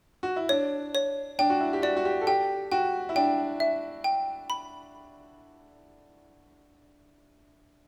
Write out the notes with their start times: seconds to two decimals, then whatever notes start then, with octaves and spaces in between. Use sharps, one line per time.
0.23 F#4
0.36 E4
0.49 D4 C#5
0.95 C#5
1.39 D4 G5
1.50 F#4
1.60 E4
1.73 G4
1.82 F#4 D5
1.97 F#4
2.05 G4
2.21 A4
2.27 G4 G5
2.72 F#4 G5
3.09 E4
3.16 D4 G5
3.60 E5
4.04 G5
4.50 B5